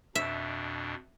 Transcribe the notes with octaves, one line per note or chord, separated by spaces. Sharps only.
F2 B2 D4 E5